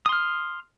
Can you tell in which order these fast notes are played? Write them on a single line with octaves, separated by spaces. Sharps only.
D#6 C6 F6